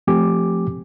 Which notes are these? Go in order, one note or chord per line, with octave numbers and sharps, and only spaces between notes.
F3 A3 C4 G4 G#5 D6